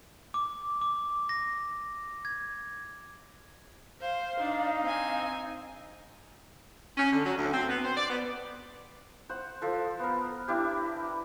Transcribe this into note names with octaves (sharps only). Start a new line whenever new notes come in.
D6
D6
A#6
G#6
C5 F5
D4 D#4
C4 G#5
C#4
D3
F#3
D2
C4
B3
C5
D5
B3
C5 F#5
F3 A4
B3 A#4
D4 E4 G4